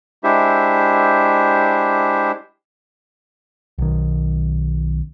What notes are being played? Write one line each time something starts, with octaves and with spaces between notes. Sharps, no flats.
G#3 D4 E4 G4 C5 E5
B1 D#3